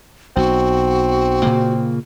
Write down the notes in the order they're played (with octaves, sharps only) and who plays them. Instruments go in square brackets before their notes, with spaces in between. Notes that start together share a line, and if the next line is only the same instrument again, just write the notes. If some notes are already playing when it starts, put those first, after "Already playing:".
[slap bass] B1 [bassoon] C4 [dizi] F#4
[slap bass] A#2 C#3 A#3